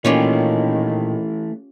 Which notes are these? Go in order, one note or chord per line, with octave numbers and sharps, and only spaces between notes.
A#2 D#3 E3 A3 C#4 F4 G4